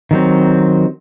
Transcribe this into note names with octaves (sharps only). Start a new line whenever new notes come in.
D#3 F#3 C4